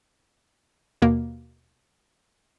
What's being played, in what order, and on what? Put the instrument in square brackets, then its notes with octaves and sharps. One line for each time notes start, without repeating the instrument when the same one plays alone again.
[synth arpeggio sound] D#2 B2 A#3